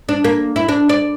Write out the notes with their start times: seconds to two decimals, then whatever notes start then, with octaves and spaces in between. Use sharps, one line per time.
0.09 D4
0.24 A#3
0.56 E4
0.69 D4
0.89 D5